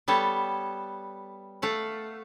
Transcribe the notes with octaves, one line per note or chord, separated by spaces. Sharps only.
G3 B3 A4 C#5
A3 F5 F#5